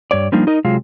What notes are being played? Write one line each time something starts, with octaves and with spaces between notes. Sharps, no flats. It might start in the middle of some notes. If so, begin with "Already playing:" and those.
G2 C#5 D5
F3 G3 A#3 D4 D#4
D#4 A#4 D#5
C3 F#3 G#3 F4 F5